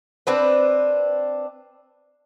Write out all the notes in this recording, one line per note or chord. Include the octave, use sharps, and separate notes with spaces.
C4 D4 B4